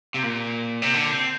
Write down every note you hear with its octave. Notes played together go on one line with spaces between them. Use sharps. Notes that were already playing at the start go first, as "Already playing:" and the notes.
C3
A#2
C3
D3
C4